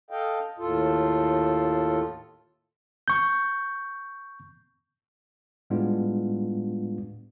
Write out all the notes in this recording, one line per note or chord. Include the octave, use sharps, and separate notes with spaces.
A4 D#5 F5 G5
D#2 A2 F4 A4
C#6 G6
A2 G3 G#3 B3 D4 F4